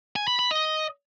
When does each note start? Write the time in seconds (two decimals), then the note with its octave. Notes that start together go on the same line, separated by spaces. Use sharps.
0.16 G#5
0.28 B5
0.39 B5
0.51 D#5